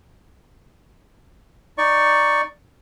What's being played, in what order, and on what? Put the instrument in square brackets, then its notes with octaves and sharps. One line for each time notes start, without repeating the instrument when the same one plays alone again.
[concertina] D#4 D5 C#6